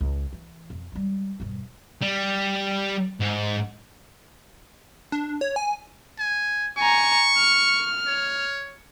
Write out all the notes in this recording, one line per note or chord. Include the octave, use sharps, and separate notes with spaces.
C#2
E3
F2
G3 G#3
E1 G2
G3
G#2
D4
C#5
G#5
G#5
G#5 A#5 C#6
F6
C#5